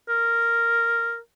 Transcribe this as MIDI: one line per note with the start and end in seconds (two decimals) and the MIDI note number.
0.09 1.17 70